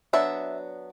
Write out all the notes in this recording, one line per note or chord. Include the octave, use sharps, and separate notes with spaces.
F#3 B3 D4 E5